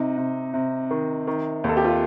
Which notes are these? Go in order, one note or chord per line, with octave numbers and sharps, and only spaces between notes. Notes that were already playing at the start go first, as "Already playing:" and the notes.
Already playing: C3 D#4
C3
C3
D#3
D#3
D#2 A4
G4
F4